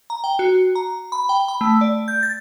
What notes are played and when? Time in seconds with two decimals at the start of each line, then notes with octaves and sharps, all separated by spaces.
0.10 A#5
0.24 G5
0.39 F#4
0.75 A#5
1.12 B5
1.29 G5
1.48 B5
1.61 A3
1.81 D5
2.08 G6
2.23 A6